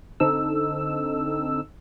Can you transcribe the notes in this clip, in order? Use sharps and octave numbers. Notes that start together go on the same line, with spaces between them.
D3 C4 D#4 A4 E6